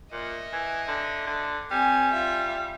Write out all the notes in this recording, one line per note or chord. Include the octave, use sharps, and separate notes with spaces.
A#2 D#5 E5
E3
D3
D3
G3 C4 G#5
F4 E5